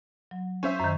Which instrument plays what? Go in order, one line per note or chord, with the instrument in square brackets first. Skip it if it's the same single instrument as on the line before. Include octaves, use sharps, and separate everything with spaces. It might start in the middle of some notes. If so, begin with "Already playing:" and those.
[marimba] F#3
[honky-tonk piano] C#4 C5 E5
[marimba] F#2 D#3